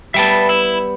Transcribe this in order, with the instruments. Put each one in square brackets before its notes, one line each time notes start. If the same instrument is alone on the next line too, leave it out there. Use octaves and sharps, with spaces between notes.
[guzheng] G3 B3 [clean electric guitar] E5 G5 A5
[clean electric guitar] E4